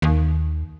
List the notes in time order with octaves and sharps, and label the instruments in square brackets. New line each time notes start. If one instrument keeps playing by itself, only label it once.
[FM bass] D#2